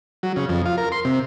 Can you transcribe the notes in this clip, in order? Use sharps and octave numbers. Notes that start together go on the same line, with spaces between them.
F#3
C#3
F2
F4
A#4
C6
C3